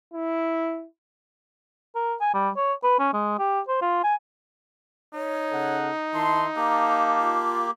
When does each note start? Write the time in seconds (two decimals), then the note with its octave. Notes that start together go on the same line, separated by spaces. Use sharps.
0.14 E4
1.95 A#4
2.21 G#5
2.34 G3
2.56 C#5
2.83 B4
2.99 C#4
3.14 G#3
3.39 G4
3.68 C5
3.82 F4
4.03 G#5
5.14 D#4 C#5
5.51 C#3 A4 F#5
6.14 D#3 E4 A5 C6
6.56 A#3 G4 F5 A5 A#5
7.19 F4